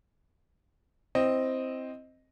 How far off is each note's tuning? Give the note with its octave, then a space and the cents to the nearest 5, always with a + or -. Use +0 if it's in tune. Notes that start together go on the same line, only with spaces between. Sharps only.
C4 +0 E4 +5 D#5 +0